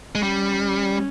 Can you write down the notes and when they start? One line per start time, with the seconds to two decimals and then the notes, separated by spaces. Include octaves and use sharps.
0.15 G#3
0.22 G3 C#4